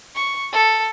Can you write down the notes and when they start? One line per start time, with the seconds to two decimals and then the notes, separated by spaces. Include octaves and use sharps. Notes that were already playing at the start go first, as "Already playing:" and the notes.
0.15 C#6
0.52 A4